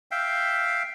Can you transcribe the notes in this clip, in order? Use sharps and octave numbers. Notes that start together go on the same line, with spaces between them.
E5 F5 G5